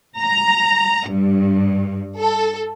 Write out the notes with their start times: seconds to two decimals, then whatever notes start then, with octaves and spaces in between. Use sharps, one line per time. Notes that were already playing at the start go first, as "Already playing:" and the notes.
0.19 A#5
1.09 G2
2.19 A4